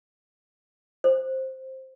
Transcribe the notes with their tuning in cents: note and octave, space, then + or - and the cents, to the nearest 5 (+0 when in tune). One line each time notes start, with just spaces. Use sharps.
C5 +5